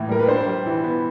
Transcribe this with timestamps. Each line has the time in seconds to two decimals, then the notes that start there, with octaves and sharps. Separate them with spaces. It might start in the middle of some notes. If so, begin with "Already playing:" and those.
Already playing: A2 E3 A#3
0.09 G3 A#4
0.19 B4
0.27 D4 C5
0.46 G3
0.66 E3
0.84 B3